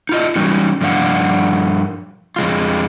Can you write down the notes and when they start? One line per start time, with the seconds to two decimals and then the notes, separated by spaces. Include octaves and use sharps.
0.09 D#4 F4 D#5
0.36 E3 F#3 G3 C#4 D#4
0.81 G2 F3 D4 F5 F#5
2.36 F2 G#3 F4